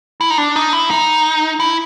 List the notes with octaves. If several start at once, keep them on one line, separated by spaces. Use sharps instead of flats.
E4
D#4
D4
D#4
E4
D#4
E4